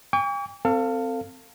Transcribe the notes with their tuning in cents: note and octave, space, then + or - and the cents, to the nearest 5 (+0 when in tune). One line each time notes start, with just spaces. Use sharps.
G5 +45 C#6 +45
C4 -10 A4 +30 F5 +0